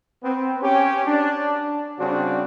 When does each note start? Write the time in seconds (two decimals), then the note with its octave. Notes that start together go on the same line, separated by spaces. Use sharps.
0.24 B3 C4
0.63 C#4 G4
1.07 D4
1.99 C#3 G3 C4 D4 F#4